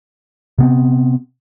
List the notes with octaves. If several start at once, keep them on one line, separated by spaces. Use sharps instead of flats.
C3 B3 C4